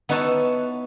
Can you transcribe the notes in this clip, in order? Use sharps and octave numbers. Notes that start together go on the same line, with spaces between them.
B3 D#4 E4 B4 C#5 A5